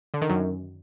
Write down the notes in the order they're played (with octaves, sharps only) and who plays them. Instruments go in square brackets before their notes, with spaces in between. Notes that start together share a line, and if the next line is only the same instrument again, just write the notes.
[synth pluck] D3
D#3
F#2